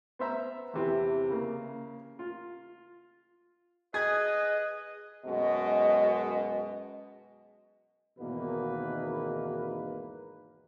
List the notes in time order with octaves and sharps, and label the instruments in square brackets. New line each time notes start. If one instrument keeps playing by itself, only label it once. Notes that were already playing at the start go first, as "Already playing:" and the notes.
[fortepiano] B3 C5 E5 A#5
E2 C3 E3
C#3 A#3
F4
[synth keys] G#4 [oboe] B4 [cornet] D#5 [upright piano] G#6
[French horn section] F#2 B2 G#3 D#5
[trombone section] G#1 E2 B2 D#3 A#3 B4